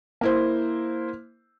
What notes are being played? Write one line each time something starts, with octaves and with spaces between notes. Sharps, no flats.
A#3 E4 C5